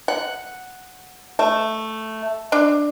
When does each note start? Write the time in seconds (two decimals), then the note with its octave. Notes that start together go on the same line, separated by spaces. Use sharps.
0.08 F#5
1.39 A3
2.52 D4